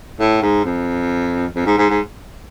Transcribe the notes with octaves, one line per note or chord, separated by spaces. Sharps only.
A2
G#2
F2
F2
G#2
G#2
G#2